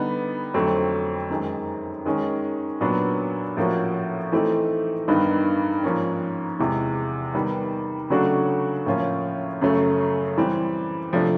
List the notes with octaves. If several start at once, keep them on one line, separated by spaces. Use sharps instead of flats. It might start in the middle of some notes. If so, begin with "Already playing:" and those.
Already playing: D3 G3 B3 D#4
F2 D3 F#3 A3 C4
F#2 D#3 G#3
D#3 G#3 C#4
A#2 F#3 B3 D4
A2 F3 A#3 C#4 F#4
E3 A3 C4 D#4
G2 D#3 G3 B3 D#4
G#2 F3 A#3 C#4
E2 C3 E3 G#3
D#3 G3 B3
C#3 F#3 A3 D4 F#4
A2 F3 A#3 C#4 F4
F#2 C#3 F#3 A3
E3 G3 C4
C3 F3 A3 D4